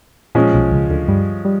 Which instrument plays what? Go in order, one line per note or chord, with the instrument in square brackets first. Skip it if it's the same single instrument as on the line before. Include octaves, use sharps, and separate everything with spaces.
[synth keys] A#2 [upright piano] F3 G#3 C#4
[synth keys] B1 B2
C#2 C#3
D2 D3
G2 G3
G3